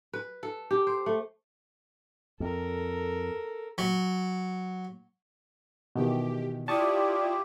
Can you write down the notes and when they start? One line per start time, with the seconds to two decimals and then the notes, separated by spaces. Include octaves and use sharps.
0.13 B4
0.43 A4
0.71 G4
0.87 C5
1.06 A3
2.40 F2 A4 A#4
3.78 F#3
5.96 B2 D#3 E3 G4
6.68 E4 F4 G4 D5 A5 C#6 D#6